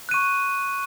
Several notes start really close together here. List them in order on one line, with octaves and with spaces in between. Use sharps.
F#6 D#7 C#6